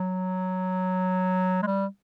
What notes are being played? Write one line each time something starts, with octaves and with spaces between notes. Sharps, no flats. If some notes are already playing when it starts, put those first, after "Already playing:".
Already playing: F#3
G#3
G3